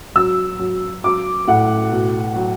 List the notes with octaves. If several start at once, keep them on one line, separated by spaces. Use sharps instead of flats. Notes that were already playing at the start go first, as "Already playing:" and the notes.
F#3 E6
F#3
F#3 D6
A2 F#5
B2
F#3